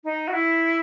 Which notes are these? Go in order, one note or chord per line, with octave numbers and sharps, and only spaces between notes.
D#4
F#4
E4